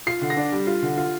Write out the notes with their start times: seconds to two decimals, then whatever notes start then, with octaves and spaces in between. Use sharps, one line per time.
0.07 F4 C7
0.22 D3
0.30 A#6
0.37 D4
0.52 G3
0.67 F4
0.83 D3
0.98 F4